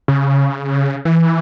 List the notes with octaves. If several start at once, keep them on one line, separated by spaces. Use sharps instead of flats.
C#3
E3